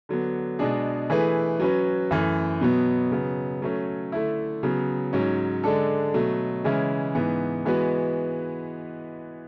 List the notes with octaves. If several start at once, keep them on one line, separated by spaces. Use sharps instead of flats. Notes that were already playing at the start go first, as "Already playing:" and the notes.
D3 F#3 B3
B2 G#3 B3 D4 G#4
E3 A3 E4 G#4 B4
F#3 C#4 F#4 B4
F#2 E3 A3
B2 F#3 B3
C#3 F#3 B3
F#3 A3 C#4
D3 A3 E4
C#3 F#3 B3
G#2 F#3 C#4
D3 G#3 D4 A4
B2 F#3 A3
C#3 E3 G#3 C#4 E4
G#2 E3 B3
E3 G#3 B3 F#4 B4